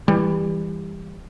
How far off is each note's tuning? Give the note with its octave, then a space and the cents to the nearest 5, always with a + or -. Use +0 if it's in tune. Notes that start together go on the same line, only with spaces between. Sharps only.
E3 +0 G3 +20